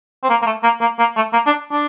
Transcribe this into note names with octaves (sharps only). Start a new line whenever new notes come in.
C4
A#3
A#3
A3
A#3
A#3
A#3
A3
A#3
D4
D4